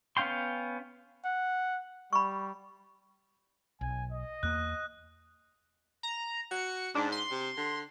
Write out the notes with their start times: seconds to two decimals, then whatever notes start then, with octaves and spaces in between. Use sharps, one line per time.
0.17 B3 C#4 F5 G5 C6
1.25 F#5
2.13 G3 B5 C#6
3.81 B1 G#5
4.12 D#5
4.43 E2 A#3 F#6
6.03 A#5
6.51 F#4 C#7
6.95 G#2 D4
7.12 C6
7.31 C3
7.57 D3